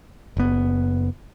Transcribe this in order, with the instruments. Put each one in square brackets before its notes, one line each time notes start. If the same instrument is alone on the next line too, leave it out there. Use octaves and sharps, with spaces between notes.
[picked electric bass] F#1 B3